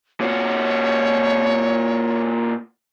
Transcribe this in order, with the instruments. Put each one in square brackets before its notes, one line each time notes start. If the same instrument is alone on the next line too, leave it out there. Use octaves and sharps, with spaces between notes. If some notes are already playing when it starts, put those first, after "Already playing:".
[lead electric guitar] A#2 F#4 [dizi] C#5